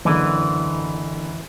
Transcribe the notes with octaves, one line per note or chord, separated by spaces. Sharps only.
F#1 D3 E3